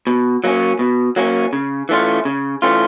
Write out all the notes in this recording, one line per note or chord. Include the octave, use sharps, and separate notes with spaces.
B2
F#3 A#3 C#4
B2
F#3 A#3 C#4
C#3
E3 A3 C#4 F4
C#3
E3 A3 C#4 F4